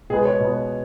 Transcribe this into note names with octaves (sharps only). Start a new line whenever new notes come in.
B2 G#3 B3 G#4
C#5
B2 G#3 B3